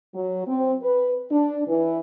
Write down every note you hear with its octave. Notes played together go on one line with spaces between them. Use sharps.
F#3
C4
B4
D4
E3